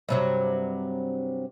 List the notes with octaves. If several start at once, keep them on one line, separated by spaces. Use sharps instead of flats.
G2 C3 F#3